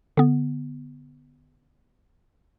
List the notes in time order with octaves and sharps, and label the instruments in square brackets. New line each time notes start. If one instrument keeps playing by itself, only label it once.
[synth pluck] D3 B3